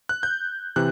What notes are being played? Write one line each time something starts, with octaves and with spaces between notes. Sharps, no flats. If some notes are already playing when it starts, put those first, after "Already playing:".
F#6
G6
C3 E3 F#6